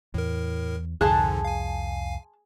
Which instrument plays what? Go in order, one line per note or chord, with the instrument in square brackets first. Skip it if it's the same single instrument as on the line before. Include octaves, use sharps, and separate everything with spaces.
[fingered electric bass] E2 [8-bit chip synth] A2 A#4
[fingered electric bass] C2 F2 [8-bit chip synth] G#2 D3 [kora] G#4 [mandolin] A5 C6 F#6
[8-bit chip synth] F5 G#5